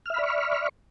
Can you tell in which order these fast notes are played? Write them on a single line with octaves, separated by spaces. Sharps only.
F6 E5 B5 D5 C#6